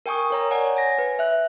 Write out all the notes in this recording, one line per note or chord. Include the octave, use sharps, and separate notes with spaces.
A#4 G5 G#5 C#6 D#6
A#4 C#5 A#5
C#5 D5 F#5 G#5
G#5 A#6
B4
E5 F#6